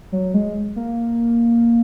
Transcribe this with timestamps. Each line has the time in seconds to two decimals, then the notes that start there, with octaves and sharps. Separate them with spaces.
0.12 F#3
0.34 G#3
0.76 A#3